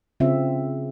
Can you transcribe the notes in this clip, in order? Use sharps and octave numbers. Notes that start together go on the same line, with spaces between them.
C#3 C4 F4 E5